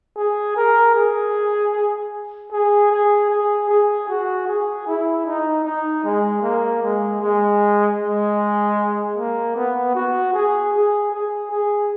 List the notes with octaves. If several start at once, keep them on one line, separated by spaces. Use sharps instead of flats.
G#4
A#4
G#4
G#4
G#4
G#4
G#4
F#4
G#4
E4
D#4
D#4
G#3
A#3
G#3
G#3
G#3
A#3
B3
F#4
G#4
G#4
G#4
G#4